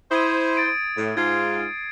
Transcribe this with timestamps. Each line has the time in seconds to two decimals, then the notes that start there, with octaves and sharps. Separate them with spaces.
0.11 E4 C5 D#6 G#6 D#7
0.56 A6 D7 D#7
0.97 A2
1.17 G#2 F4 G#6 C7